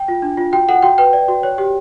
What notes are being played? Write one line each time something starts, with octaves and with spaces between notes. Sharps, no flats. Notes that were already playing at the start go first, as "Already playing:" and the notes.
Already playing: G5
F4
D4
F4
F#4 G5
A4 F#5
F#4 G5
B4 G5
D5
F#4
C#5
G4